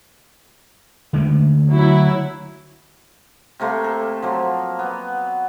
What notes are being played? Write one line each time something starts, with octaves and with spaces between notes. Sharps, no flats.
D3 G#3 A3
F#3 E4
C3 A3 A#3 C6
A4
F3 F#3 A#3
B3